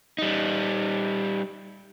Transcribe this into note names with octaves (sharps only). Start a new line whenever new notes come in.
G3 D#4